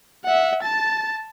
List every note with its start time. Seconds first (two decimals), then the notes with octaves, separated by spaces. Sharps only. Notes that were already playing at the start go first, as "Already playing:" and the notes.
0.24 E5 F#5
0.63 A5 A6